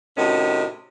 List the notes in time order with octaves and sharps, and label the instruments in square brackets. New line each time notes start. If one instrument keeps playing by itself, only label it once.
[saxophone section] A2 C3 D#3 C#4 F#4